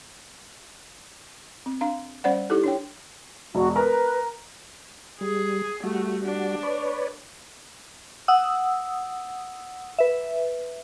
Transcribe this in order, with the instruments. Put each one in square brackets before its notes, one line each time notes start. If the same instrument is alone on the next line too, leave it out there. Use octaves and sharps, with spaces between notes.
[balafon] C4
D4 F5 A#5
G3 C#4 C5 D5 F#5
D#4 E4 G4 A4
D4 C#5 G5
[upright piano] E1 [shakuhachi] F#4
[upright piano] A#4 A#5 [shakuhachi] B4
[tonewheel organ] G3 [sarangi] G#4
[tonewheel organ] G3 F#4 [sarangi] A3
[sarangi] D4
[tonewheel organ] B4 C#5 D5
[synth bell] F#5 D#6 E6
B4 E5